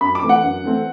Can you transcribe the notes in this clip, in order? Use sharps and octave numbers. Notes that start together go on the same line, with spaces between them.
F#2 B5
D6
E3 A3 C4
F#5
F#2
E3 A3 C4